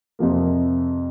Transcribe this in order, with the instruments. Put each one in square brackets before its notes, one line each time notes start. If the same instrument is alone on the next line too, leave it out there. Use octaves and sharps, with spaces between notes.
[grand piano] F2 C3 F3 A#3